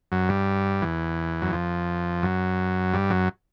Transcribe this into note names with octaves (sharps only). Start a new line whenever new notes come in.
F#2
G2
E2
F#2
F2
F#2
G2
F#2